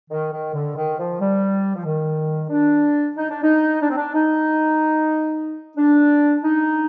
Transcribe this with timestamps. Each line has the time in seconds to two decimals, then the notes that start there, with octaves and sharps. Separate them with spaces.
0.10 D#3
0.32 D#3
0.54 D3
0.76 D#3
0.98 F3
1.20 G3
1.75 F3
1.85 D#3
2.50 D4
3.16 D#4
3.30 D4
3.43 D#4
3.81 D4
3.89 C4
3.97 D4
4.14 D#4
5.77 D4
6.43 D#4